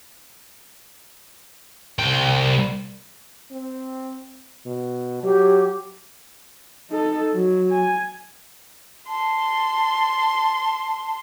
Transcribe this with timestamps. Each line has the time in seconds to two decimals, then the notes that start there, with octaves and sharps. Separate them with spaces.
1.99 C2 G5
3.51 C4
4.66 B2
5.23 F#3 G4
6.91 D#4 A4
7.33 F#3
7.71 G#5
9.08 A5 C6